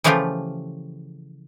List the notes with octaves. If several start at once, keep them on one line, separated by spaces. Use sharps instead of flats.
C#3 E3 F3 A3 F4 G4